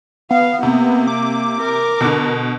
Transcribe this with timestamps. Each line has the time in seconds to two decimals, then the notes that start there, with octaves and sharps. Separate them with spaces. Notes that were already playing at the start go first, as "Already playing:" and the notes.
0.31 B3 F5
0.63 C3 A#3
1.07 D6
1.60 A#4
2.01 B2 D3